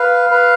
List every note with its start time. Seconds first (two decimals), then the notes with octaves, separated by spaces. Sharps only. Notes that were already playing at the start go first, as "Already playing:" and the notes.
Already playing: B4 F5
0.31 B4